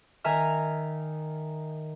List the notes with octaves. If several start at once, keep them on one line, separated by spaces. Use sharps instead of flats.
D#3 E5 G#5 A#5 F6